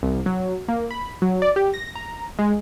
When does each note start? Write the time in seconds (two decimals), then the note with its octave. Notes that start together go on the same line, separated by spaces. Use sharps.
0.03 C2
0.26 F#3
0.68 A#3
0.91 B5
1.22 F#3
1.42 D5
1.56 G4
1.74 A#6
1.95 A#5
2.39 G#3